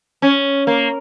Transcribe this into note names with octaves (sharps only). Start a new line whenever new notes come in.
C#4
A#3